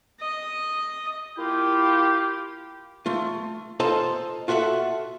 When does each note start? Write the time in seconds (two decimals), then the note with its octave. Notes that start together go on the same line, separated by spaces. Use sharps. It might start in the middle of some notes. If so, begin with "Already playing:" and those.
0.21 D#5
1.38 A#3 E4 F4 G4
3.06 A3 F4
3.80 F4 A4 C5 D#5 A5 A#5
4.48 F4 F#4 A4 E5 F#5